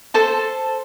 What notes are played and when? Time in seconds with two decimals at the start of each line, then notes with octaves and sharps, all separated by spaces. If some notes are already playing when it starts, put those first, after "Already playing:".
0.14 A4 C5 A5